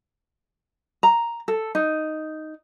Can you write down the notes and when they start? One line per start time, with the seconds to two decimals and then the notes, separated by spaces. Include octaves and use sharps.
1.03 A#5
1.48 A4
1.75 D#4